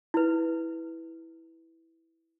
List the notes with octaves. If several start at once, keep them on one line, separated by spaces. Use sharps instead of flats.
E4 B4